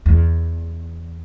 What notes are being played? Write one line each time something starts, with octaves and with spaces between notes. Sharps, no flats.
E2